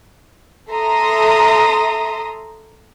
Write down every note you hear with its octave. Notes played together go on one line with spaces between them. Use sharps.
A4 E5 A#5 C6 D#6